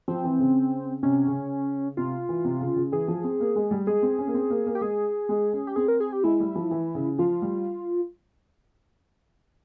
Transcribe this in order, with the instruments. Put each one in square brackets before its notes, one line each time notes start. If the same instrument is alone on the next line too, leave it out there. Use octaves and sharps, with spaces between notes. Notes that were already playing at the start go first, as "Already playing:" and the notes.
[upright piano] F3 [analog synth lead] C4
[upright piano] E3
C#3
[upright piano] C3 [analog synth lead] C#4
[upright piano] C#3
[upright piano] C3 [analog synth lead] F4
[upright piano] E3
C3
C#3
C#3
[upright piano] E3 [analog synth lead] G#4
[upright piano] F3
C4
A#3
G#3
G3
[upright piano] G#3 [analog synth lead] G#4
[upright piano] C4
C#4
A#3
C4
A#3
A#3
[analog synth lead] G4
[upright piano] G#3 [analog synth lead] G#4
[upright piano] G#3
C#4
[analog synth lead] G4
[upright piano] C4 [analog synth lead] G#4
[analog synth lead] A#4
G#4
G4
[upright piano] G#3 [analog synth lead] E4
[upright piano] G3
F3
E3
C#3
[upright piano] F3 [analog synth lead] F4
[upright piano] G3